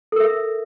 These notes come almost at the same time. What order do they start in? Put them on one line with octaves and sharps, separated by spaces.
A4 A#4 E5